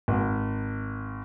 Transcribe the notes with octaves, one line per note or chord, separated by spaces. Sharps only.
G#1